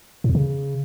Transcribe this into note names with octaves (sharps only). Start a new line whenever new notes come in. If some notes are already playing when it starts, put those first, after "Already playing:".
A2
E2
C#3